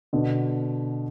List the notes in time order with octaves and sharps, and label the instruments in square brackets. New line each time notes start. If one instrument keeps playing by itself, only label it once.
[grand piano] B2 D3